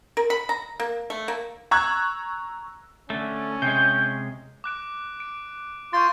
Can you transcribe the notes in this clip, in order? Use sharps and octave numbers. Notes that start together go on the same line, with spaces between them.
A#4
B5
A#5
A#3
A3
A#3
A#5 C#6 E6 F#6 G#6
D3 A3 C#4
C3 G#3 G6
D6 F#6 D7
D7
F4 C6 C#6 G6 A6